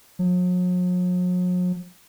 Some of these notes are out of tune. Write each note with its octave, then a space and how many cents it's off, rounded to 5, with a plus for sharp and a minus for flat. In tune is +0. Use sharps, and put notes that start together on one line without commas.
F#3 -45